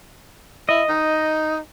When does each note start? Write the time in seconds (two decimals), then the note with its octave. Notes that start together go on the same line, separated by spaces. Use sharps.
0.69 E4 D#5
0.89 D#4